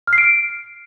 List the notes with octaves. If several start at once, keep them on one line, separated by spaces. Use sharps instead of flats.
F6
C7
D7